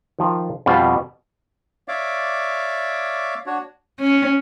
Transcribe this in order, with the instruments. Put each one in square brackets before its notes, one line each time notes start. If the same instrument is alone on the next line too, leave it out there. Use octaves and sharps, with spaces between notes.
[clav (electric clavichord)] D#3 F3 F4
F2 B2 G3 F4 B4 F5
[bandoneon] C#5 D5 E5 F5 D6
D4 F#4 C#5
[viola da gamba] C#4